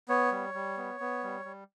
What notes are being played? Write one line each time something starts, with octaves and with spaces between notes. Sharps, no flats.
B3 C#5
G3
G3
B3
B3
G3
G3